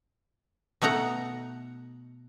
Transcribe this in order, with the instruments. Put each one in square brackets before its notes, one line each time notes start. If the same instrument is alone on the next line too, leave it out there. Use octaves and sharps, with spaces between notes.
[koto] B2 A3 D#4 F#5 A#5